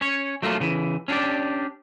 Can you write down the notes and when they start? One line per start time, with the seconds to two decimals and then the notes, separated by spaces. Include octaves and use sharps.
0.01 C#4 C#5
0.42 F#3 A3 A#3 F4 A4
0.60 C#3 E3
1.08 C#4 D4 F#4 G4 D5